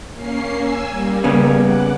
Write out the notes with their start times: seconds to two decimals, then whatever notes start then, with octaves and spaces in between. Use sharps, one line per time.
0.13 A#3 C#4 C7
0.57 G#5 E6
0.90 G3 A#3
1.24 C#3 B3 C#4
1.62 F#5 D6 F#6